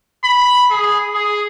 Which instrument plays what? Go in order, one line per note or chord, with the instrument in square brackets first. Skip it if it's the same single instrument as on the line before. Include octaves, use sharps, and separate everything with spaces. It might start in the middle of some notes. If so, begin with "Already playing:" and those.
[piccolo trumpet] B5
G#4
G#4